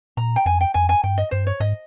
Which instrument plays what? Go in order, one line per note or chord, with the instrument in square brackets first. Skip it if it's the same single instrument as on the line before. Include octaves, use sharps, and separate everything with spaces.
[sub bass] A#2 [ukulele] A#5
[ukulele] G5
[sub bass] F2 [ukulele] G#5
[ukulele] G5
[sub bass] F2 [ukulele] G#5
[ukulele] G#5
[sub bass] G2 [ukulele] G5
[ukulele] D#5
[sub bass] G2 [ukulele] C5
[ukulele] C#5
[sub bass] G#2 [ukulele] D#5